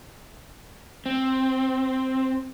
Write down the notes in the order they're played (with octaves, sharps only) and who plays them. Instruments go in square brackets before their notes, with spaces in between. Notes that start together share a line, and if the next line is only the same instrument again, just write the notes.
[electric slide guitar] C4